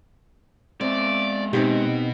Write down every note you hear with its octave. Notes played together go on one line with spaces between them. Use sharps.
G#3 C4 D5 E5
B2 C4 D#4 G4